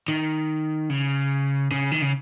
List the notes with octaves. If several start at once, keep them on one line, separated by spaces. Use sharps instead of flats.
D#3
C#3
C#3
D#3
C#3